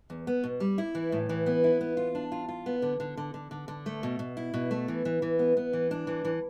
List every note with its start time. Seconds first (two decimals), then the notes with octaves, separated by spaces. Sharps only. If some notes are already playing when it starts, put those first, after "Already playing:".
0.10 E2
0.27 B3
0.44 B2
0.60 G3
0.78 E4
0.95 E3
1.12 A2
1.29 E3
1.46 B3
1.64 E4
1.81 B3
1.97 F4
2.15 D4
2.32 F4
2.49 F4
2.66 B3
2.82 D3
3.00 D3
3.17 D3
3.34 D3
3.51 D3
3.68 D3
3.86 A3
4.03 B2
4.19 B2
4.37 E4
4.54 B2
4.71 A3
4.88 E3
5.05 E3
5.22 E3
5.39 B3
5.57 B3
5.73 E3
5.91 D4
6.07 E3
6.25 E3